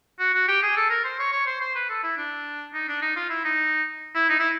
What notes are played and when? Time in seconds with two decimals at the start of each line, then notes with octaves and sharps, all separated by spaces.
0.19 F#4
0.34 F#4
0.48 G4
0.62 G#4
0.76 A4
0.90 A#4
1.04 C5
1.19 C#5
1.32 C#5
1.46 C5
1.61 C5
1.75 B4
1.89 A4
2.03 E4
2.17 D4
2.74 D#4
2.88 D4
3.02 D#4
3.16 F4
3.30 E4
3.45 D#4
4.15 E4
4.29 D#4
4.39 E4